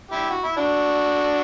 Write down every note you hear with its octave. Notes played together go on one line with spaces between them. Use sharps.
E4 G4
F#4
E4
D4 F#4